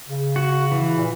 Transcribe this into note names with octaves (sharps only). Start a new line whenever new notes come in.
C#3
F#4
E3
A#2